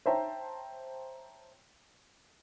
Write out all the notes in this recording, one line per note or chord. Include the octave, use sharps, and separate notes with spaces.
C5 C#5 E5 G5 A5 A#5